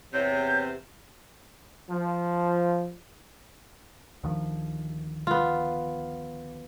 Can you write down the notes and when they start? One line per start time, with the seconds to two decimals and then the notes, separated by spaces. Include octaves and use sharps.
0.13 E2 C3 C#5 G6
1.90 F3
4.23 D2 D#3 F3
5.27 B3 F4